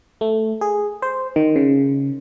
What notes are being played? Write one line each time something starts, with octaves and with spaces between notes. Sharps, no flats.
A3
G#4
C5
D#3
C#3